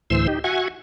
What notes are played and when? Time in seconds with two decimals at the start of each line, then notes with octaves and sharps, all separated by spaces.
0.10 D2 A2 E3 C5 C6 E6
0.27 D#4 G4
0.44 F#4 E5 F#5 G#5 C#6 G#6